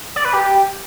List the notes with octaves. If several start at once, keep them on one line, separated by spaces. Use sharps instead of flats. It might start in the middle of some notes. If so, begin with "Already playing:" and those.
D5
B4
G4